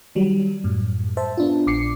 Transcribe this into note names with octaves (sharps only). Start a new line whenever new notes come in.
D#3 F#3 G3
F#2 A2
C5 E5 A5
B3 D4 F4
A#1 D6 C7 C#7